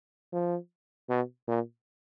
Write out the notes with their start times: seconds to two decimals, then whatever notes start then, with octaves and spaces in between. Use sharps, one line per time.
0.33 F3
1.09 B2
1.48 A#2